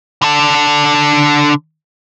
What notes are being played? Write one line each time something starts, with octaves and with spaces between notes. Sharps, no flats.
D3 A4